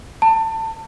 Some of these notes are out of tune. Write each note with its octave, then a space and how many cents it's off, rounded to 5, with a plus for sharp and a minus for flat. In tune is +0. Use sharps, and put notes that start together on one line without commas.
A5 +25